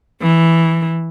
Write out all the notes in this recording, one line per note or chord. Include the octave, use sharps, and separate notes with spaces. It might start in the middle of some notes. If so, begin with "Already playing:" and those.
E3